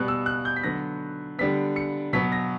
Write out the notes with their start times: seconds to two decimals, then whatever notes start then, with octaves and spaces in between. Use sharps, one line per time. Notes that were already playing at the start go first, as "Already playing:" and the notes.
Already playing: B2 G3 B3 F#6
0.08 E6
0.26 F#6
0.45 G6
0.56 B6
0.64 D3 F#3 B3 A#6
1.39 D3 G3 B3 B6
1.76 C#7
2.13 B2 F#3 B3 B6
2.32 A#6